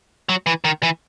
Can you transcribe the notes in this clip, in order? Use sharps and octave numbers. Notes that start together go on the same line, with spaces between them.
F#3
E3
D#3
E3